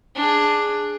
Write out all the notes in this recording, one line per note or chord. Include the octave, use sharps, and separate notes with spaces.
D4 G#4